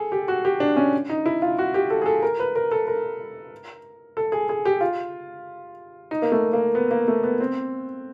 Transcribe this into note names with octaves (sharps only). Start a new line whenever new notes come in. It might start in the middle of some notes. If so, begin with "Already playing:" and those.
Already playing: G#4 A4
G4
F#4
G4
D4
C#4
D#4
E4
F4
F#4
G4
A4
G#4
A4
A#4
B4
A#4
A4
A#4
A4
G#4
G#4
G4
F4
D#4
A#3
A3
A#3
B3
A#3
A3
B3
C4